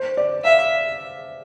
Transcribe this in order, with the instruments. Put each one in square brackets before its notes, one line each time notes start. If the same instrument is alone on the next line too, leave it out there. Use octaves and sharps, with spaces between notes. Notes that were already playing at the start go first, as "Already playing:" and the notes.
Already playing: [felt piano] C5
D5
[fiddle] E5 [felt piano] F5